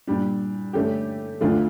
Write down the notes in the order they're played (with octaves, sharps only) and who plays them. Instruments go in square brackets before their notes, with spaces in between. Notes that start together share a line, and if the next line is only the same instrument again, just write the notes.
[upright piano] A#2 G3 D4
D3 A3 C#4 G4
D2 D3 A3 D4 F4